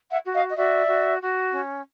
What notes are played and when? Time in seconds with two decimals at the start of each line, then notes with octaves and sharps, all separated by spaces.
0.10 E5 F#5
0.27 F#4
0.34 D#5 F5
0.50 D#5
0.57 F#4 D5 E5
0.88 F#4
1.21 F#4
1.52 C#4